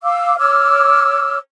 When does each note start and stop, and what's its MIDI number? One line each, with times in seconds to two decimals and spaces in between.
0.03 0.34 77
0.03 0.34 86
0.03 0.34 88
0.38 1.37 73
0.38 1.37 86
0.38 1.37 88
0.38 1.37 89